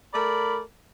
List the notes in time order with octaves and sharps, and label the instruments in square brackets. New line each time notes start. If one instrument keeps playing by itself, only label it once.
[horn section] A3 A#4 D5 B5